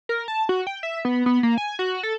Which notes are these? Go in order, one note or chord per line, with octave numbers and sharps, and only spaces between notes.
A#4
A5
F#4
G5
E5
B3
B3
A#3
G#5
F#4
A4